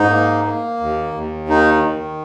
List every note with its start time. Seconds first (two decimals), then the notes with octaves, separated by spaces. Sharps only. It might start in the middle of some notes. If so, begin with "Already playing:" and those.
Already playing: G#2 D#4
0.10 A#3
0.45 A#3
0.80 D#2
1.14 D#2
1.49 D#3 D#4
1.83 D#3